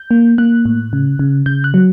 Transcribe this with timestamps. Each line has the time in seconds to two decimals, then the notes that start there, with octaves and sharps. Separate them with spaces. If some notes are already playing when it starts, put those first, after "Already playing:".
Already playing: G6
0.11 A#3
0.38 A#3 F#6
0.65 A2
0.93 C#3
1.19 C#3
1.46 C#3 G6
1.64 F#6
1.74 F#3